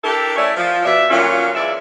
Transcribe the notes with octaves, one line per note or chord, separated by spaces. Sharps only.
D4 E4 G4 A4 A#4
A3 C#4 E4 C#5 D5
F3
B2 D5 E5
A#2 D3 F#3 C#4 F4
E2 G#3 D5 E5